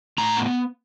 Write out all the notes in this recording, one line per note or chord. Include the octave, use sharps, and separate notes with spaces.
A2 A#5
B3